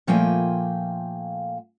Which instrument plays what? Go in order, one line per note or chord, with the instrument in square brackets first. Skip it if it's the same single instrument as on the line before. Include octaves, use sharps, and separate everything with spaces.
[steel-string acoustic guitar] A#2 F3 A3 A#3 G5 G#5